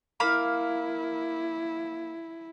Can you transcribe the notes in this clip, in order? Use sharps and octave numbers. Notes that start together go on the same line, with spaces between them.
A#3 E4 F5 B5